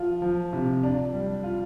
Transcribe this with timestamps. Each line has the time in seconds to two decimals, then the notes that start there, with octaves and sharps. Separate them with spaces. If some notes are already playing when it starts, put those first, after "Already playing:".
Already playing: F3 F4
0.22 F3
0.53 C3
0.84 D4
1.13 G3
1.43 F4